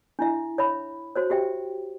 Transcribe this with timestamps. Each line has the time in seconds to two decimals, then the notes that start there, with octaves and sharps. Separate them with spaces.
0.19 D4 E4 E5
0.58 C#5 E5 B5
1.15 F#4 C5 C#5
1.30 F#4 G4 E5 G5